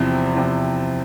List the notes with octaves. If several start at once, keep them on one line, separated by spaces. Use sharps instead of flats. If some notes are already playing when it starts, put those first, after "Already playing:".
Already playing: E2 C3 F3 C4 E4
E2 C3 F3